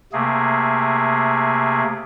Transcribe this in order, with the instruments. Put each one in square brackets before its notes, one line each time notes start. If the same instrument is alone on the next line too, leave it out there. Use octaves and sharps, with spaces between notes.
[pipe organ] C3 A3 A#3 G#4